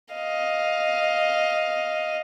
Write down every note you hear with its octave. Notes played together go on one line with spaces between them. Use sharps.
D#5 F5